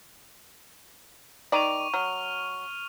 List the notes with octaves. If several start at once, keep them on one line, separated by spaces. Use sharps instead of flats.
D#3 D5 C#6 D#7 F7
F#3 F6